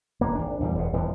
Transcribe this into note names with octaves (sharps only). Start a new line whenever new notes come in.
D#1 F2 A#3
G#1 D4
A#1 E2 F3 G3
E1 F2 B2
D#1 F2 E3 F3